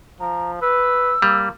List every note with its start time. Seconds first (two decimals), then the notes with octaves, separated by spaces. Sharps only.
0.20 F3 A#5
0.62 B4 E6
1.22 G3 A#3